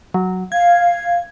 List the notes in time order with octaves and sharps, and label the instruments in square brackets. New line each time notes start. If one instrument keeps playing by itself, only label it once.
[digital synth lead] F#3
[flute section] F5 [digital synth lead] G#6